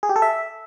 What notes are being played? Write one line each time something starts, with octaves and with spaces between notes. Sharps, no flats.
G#4
G4
A4
E5